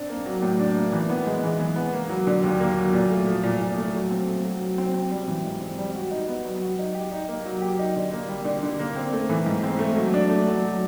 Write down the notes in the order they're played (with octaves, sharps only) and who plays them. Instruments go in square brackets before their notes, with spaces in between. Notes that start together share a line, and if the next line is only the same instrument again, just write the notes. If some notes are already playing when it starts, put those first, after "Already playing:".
Already playing: [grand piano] C4 D4
A#3
F#3
A2
D4
A#3
E3
B3
G#3
E3
E3
B3
A#3
F#3
D3
D#2
A#3
F#3
A#2
A3
F3
A#2
A#2
A3
F#3
C4
A3
F#3
F#3
C4
C4
G3
E3
G#2
C4
G3
F#4
D#4
B3
F#3
F#4
D#4
G4
D#4
A#3
F#3
G4
D#4
D3
A#3
G3
D3
D3
A#3
C4
A3
E3
G#2
C4
A3
F#3
D4
A3
F#3
F#3